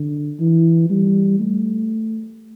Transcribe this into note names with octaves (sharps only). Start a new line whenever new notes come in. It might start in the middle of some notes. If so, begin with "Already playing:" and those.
Already playing: D3
E3
G3
A3